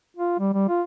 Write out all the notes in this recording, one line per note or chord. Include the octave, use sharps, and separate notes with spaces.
F4
G3
G3
F4